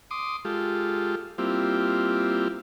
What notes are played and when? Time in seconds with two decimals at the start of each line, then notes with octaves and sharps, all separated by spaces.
0.11 C6 D6 D#6
0.45 G#3 F4 G4 A4
1.38 G3 A#3 C4 E4 F4 G4